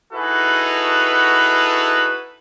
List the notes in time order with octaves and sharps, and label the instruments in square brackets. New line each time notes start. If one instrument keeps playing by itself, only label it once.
[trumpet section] D#4 E4 F#4 G#4 A4 B4